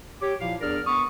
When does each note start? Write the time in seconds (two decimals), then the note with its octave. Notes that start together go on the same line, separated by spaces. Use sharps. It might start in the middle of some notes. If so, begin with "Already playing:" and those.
0.21 G4 C#5 D6
0.40 A#2 F3 E4 F5
0.61 E2 D4 G#4 A#4 D5 F6
0.86 B3 C#6 D#6